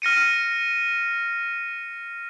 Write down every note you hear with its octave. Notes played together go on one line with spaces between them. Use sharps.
F6 A#6 C#7 D#7